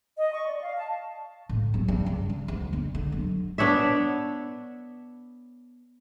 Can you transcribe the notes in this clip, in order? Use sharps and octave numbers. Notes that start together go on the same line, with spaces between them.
D#5
C#6
D5
F5
A5
A2
F#3
G2
C#2
G3
D2
D3
D3
F#3
B3 D4 C#5 E5